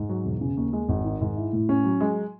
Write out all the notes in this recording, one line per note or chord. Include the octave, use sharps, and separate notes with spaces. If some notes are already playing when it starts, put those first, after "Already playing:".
Already playing: G#2
F#3
E1
C#3
D#2
G#3
G#1
D#3
G#2
E4
A2
C#4
F#3
G#3